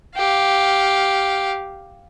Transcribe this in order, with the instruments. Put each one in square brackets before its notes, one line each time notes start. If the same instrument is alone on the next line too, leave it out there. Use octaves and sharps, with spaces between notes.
[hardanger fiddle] G4 F5